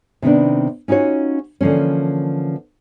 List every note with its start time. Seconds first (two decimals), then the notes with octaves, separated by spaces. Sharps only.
0.22 C3 D#3 B3 D4
0.88 C#4 D#4 F4 F#4 C#5
1.61 D3 E3 F3 A#3 C#4